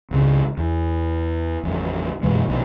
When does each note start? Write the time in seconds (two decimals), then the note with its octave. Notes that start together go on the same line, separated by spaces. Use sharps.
0.11 G#1 C#2 C#3
0.57 E2
1.63 A1 F2
2.23 F#2 B2 E3 G#3
2.48 A#1 B2 D#3